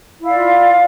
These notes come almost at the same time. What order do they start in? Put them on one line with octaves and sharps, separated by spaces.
E4 F5 D5 F4